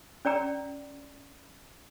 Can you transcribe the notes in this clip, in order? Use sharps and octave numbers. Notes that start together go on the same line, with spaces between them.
C#4 D5 G5 A#5